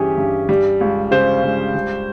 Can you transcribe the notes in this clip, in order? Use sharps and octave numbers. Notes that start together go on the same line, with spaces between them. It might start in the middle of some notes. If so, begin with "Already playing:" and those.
Already playing: G2 E3 C#4 G4 G#4
G2
G3
C#2
C#3 C5
C#2
G3